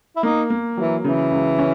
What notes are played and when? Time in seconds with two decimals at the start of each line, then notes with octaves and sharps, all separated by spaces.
0.16 E4
0.23 A#3 D#4
0.50 A#3
0.77 E3 F#3
1.04 C#3 E3
1.32 C#2
1.59 C#4